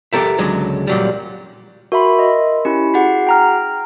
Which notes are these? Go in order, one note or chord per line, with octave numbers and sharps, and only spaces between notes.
G4 A4 A#4 E5
C#2 D3 F#3 G#3
A#2 F#3 G3
F#4 A#4 E5 B5 C6
D#5
C#4 E4 G4
F#4 G#4 F#5
G5 A#5 F6